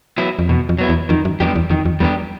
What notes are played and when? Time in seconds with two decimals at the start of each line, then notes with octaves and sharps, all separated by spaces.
0.18 F#3 B3 E4
0.39 F2
0.49 E2 B2
0.69 F2
0.78 F#3 B3 E4
0.89 E2
1.09 F2 D#3
1.25 F#2
1.40 F2 G3 B3 D4 G4
1.56 E2
1.70 F2 D#3
1.85 F2
2.00 E2 G3 B3 D4 G4